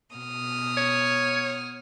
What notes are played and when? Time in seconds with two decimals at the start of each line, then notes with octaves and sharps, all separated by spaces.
0.15 B2 D#6 F6
0.77 C#5